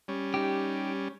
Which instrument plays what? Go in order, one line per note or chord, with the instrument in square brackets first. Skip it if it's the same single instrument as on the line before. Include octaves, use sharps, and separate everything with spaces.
[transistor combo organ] G3 C#4
[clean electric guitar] D#4 G4